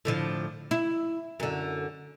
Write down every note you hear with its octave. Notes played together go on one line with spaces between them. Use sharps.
A2 D3 F3
E4
F#2 D3